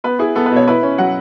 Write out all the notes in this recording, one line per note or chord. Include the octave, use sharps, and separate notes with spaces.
B3 B4
E4 G#4
B3 A4
B4
B2 C#5
E4 B4
C#4
F#3 F#5